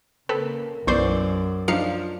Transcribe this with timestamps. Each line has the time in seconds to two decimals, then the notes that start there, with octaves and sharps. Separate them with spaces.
0.29 C#3 A#3 C4 A4 B4
0.87 B1 F#2 E3 C5 D5 C#6 G6
1.68 F3 D4 D#4 F5 C#7